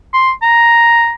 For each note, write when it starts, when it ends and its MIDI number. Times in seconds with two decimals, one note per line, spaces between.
0.14 0.31 84
0.42 1.12 82